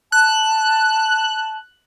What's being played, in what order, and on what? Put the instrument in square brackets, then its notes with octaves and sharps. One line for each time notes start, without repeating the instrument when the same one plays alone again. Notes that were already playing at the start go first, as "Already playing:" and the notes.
[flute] A5 [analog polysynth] F#6